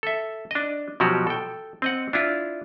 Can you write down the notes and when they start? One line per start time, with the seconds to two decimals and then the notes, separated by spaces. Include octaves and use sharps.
0.03 A4 E5
0.51 D4 D#5
1.00 B2 F3 F#3 F#4 G4
1.27 A4 G5
1.82 C4 D#5 F#5
2.13 D4 E4 F4